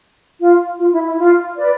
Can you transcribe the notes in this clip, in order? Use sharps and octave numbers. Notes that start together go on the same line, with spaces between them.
F4
F4
E4
E4
F4
B4 D5